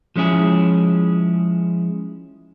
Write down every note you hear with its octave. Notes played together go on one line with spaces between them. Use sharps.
F3 G#3 C#4 E4 G#4